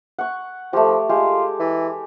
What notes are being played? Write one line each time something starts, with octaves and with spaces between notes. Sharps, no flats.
F#5 C#6
F3 A3 G4
G#3 F4 G4
E3